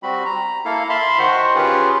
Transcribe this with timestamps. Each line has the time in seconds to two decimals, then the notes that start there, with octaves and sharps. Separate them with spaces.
0.03 G3 C4 F#4 B5
0.26 A#5
0.65 A#3 E4 A4 F5
0.90 E5 F5 A5 B5 C6
1.19 D#3 F#4 C5 F#5
1.55 C#4 F4 G4 G#4 B4